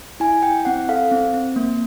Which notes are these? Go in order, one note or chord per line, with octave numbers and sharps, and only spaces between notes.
E4 G#5
E4 G5
C4 F#5
A4 F5
C4
C4
A#3